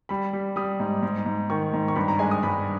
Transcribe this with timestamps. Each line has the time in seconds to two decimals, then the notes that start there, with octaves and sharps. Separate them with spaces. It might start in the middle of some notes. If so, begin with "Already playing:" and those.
0.09 G3 B5
0.33 G3
0.56 G3 D#6
0.80 G#2
1.03 G#2
1.26 G#2
1.50 D#3 C#6
1.73 G#2
1.88 C#6
1.96 G2 B5
2.08 A#5
2.19 G#3 G#5
2.31 D#6
2.43 G2 B5